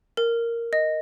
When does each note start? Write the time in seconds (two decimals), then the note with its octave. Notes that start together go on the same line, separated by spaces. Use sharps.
0.17 A#4
0.73 D#5